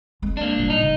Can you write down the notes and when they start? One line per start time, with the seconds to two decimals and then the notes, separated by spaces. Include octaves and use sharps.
0.22 G#3 C4
0.37 A#3 D4
0.57 A#2 G3
0.70 D#4
0.81 C3 A3